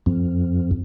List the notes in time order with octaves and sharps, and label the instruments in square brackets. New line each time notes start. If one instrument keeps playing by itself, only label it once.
[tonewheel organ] F2